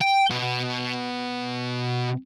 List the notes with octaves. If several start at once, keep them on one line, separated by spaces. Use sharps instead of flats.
G5
B2